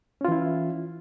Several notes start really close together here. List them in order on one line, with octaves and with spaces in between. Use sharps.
C#4 F4 E3 E4